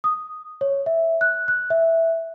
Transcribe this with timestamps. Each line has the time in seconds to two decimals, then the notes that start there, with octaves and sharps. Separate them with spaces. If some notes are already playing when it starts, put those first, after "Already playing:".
0.04 D#6
0.61 C#5
0.86 E5
1.21 F#6
1.48 F#6
1.70 E5